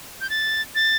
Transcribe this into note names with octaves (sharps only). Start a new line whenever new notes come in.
G6
A6
A6